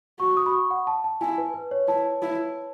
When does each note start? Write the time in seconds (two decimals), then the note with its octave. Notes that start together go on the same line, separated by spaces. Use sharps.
0.20 F#4 C#6
0.37 D#6
0.46 B5
0.54 C#6
0.71 F#5
0.87 A5
1.04 A5
1.21 E4 G#5
1.38 B4
1.54 B4
1.71 C#5
1.88 E4 A5
2.22 E4